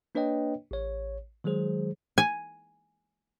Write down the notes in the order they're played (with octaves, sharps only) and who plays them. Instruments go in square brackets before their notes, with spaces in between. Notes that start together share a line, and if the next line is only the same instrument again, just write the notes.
[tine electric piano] A#3 D4 B4 C#5 D#5 G5
A1 C#5
D#3 F#3 G#3 G#4 C5
[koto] G#5